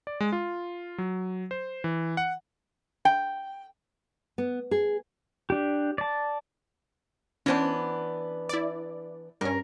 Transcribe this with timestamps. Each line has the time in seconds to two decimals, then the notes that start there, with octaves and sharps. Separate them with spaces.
0.07 D5
0.20 G#3
0.32 F4
0.98 F#3
1.51 C5
1.84 E3
2.17 F#5
3.05 G5
4.38 B3
4.71 G#4
5.50 D4 G4
5.98 D5 A5
7.46 E3 B3 C#4 D4 C5
8.49 E4 D5
9.41 G2 C#4 A#4